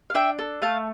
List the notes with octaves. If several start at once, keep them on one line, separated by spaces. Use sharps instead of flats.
F5
D4 E5 G5
A4
A3 F5 A5